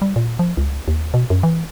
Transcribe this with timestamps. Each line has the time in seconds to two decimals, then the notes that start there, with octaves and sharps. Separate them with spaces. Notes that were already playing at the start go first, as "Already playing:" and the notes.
0.02 G3
0.16 A#2
0.39 F3
0.57 C#2
0.88 D#2
1.14 B2
1.30 F#2
1.43 E3